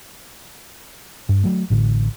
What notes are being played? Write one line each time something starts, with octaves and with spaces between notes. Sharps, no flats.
G2
F#3 A3
A1 A2 D3